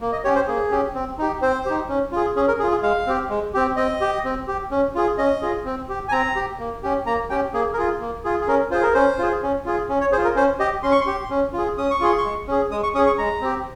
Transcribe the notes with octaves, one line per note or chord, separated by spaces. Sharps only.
A#3
D#5
C#4 G4 C#5
C5
A#3 G#4
C#4 G4
C4
D#4 G4
C4 C5
D#4 G4
C#4
F4 G#4
C#4 G#4
A#4
G#4
F4
G#4
G#3 F5
C4 G4
G#3
C4 G4
C4 D#5
G4
C4
G4
C#4
F4 G#4
C#4 D#5
F4 G#4
C4
G4
G#5
C4 A#5
G4
A#3
C#4 G4
A#3 A#5
C#4 G4 G5
A#3 G#4
A#4
F4 G#4
A#3
F4 G#4
G#4
C#4 A#4
F4 G#4 C5
A#4
C#4 C5
F4 G#4
C#4
F4 G#4
C#4
C#5
G#4 C5
F4
A#4
C#4 C5
G4 D#5
C#4 C6
C#6
C6
G4
C#4
F4 G#4
C#4 D#6
C#6
F4 G#4 C6
C#6
G#3
C#4 G#4
G#3 D#6
C#6
C#4 G#4 D#6
C#6
G#3 A#5
C4 G4